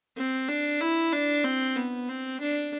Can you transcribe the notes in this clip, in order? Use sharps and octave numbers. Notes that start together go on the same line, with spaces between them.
C4
D4
E4
D4
C4
B3
C4
D4